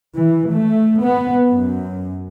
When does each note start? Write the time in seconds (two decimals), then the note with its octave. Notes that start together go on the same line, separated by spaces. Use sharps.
0.16 E3
0.51 A3
1.01 B3
1.48 F#2